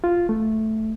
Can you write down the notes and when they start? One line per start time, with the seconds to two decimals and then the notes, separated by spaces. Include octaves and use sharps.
0.04 F4
0.29 A3